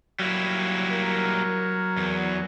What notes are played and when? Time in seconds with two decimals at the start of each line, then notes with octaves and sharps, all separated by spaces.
0.19 F#3 G3 A#3 E4
0.90 A#4
1.97 E2